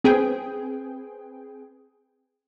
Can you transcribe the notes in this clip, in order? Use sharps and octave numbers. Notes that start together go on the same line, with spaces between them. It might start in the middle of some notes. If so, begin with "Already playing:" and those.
C4 G#4 B4 G5